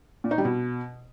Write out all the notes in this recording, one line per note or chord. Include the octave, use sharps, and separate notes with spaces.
A#2
D#4
G3
B2